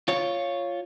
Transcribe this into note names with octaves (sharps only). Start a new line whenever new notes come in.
F4 C#5